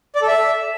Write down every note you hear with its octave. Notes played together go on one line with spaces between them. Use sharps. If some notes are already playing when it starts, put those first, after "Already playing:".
D5
A4
E5